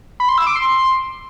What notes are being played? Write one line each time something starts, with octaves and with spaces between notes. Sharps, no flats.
B5
C6
E6
D6
C6